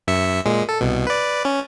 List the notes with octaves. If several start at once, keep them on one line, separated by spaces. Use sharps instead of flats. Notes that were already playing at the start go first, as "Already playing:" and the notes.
F#2 E5 C#7
A#2 G#3
A4
C2 B2
B4 D5
C#4